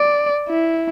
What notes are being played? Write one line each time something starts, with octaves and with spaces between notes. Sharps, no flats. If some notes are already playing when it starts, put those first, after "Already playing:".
Already playing: D5
E4